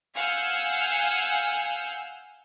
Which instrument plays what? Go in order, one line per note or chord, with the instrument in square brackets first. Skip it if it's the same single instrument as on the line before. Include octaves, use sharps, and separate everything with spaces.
[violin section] F5 F#5 G#5 E6 F6 G6